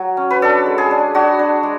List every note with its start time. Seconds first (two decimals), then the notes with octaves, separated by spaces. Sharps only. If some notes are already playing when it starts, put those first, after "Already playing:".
Already playing: F#3
0.17 C#4
0.31 B4
0.42 D4 A4
0.66 G#3
0.78 G#4
0.91 D4
1.14 D4 F#4
1.39 D4
1.63 G#3